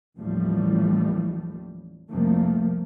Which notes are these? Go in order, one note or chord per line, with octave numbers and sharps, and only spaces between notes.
A1 D#2 A2 E3 F3 G3
C2 F2 F3 A3 A#3